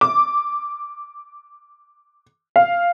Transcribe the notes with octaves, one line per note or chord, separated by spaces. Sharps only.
D6
F5